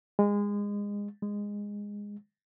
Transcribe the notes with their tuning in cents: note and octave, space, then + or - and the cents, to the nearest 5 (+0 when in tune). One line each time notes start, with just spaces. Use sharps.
G#3 -25
G#3 -15